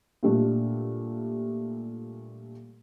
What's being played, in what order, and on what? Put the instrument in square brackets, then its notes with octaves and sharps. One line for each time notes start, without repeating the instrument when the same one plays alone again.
[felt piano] A#2 G3 A3 D4